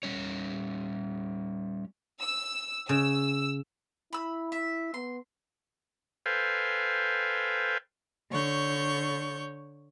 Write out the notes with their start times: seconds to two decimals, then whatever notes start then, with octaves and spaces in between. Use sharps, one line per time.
0.03 G3 C#4 C#5
2.22 E6
2.89 C#3 E6
4.13 E4 B5 E6
4.52 E5
4.94 B3 C6
6.26 A4 B4 C5 F5 G5 G#5
8.31 D3 C#5 C#6 G6